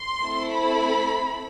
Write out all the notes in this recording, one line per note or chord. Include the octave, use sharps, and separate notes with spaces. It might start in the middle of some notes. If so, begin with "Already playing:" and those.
Already playing: C6
A3 C4 E4 A4
B5